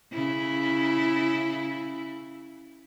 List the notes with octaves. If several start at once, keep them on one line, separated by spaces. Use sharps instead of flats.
C#3 E4